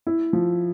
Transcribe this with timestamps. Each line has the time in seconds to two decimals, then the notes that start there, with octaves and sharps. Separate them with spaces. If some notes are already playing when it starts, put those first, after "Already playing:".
0.07 E4
0.33 F3